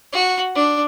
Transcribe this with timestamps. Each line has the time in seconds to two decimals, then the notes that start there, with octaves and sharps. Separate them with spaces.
0.13 F#4
0.55 D4